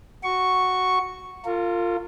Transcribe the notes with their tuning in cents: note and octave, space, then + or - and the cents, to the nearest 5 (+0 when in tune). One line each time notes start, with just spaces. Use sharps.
F#4 +0 C#6 +0
F4 +0 A#4 -45